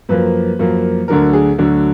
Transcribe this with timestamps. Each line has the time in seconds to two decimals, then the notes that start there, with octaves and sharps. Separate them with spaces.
0.09 F#2 F3 A#3 B4
0.59 F#2 F3 A#3
1.08 D2 D3 F#3 A#4
1.33 G#4
1.58 D2 D3 F#3